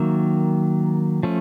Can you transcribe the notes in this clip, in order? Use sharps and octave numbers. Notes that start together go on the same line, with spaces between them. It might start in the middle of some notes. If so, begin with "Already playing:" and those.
Already playing: D#3 F#3 A#3 E5
F3 A3 C#4